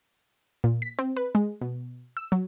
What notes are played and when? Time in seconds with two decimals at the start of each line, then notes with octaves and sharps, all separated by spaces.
0.64 A#2
0.82 B6
0.99 C4
1.17 B4
1.35 G#3
1.61 B2
2.17 E6
2.32 F#3